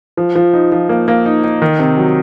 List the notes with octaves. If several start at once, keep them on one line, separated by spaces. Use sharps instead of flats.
F3
F3
D#4
F3
A#3
A#3
D#4
D#4
D#3
C3
F#3